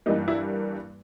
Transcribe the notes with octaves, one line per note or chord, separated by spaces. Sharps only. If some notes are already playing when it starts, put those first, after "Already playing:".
G2 E3 G3 A#3 D#4
E4